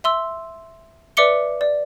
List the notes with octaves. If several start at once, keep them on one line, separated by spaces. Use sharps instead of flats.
E5 C6 E6
B4 D5 E5 D6 C#7 G7
D5